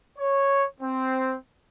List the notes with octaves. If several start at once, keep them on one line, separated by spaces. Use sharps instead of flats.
C#5
C4